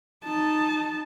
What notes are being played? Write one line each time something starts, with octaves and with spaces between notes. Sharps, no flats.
D#4 A5